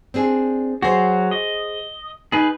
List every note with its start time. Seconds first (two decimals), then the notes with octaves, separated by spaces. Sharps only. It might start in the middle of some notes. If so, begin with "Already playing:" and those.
0.14 C4 D4 G#4
0.82 F#3 F#4 G#4 C5
1.31 D#5
2.32 D#4 G#4 B4